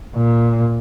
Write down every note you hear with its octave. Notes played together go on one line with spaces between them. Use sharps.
A#2